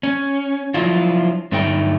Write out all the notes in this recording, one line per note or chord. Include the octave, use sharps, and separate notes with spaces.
C#4
F3 F#3 D4 E4 F4
G2 D3 F#3 A3 D#4 G5